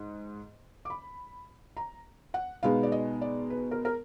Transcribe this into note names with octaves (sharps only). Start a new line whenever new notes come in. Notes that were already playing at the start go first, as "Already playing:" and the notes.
Already playing: G#2
D6
B5
A#5
F#5
B2 G#3 B3 D#4 F5
D5
D#5
D5
B4
A#4
A#4